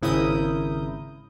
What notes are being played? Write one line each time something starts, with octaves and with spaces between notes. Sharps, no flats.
G#1 C#3 E4 A#4 D#6 G6